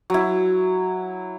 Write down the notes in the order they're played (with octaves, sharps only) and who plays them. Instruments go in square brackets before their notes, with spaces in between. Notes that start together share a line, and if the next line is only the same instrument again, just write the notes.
[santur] F#3 E4